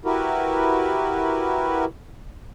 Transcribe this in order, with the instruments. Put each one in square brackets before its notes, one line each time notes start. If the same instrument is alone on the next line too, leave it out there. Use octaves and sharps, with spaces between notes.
[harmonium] E4 F#4 G4 A#4 B4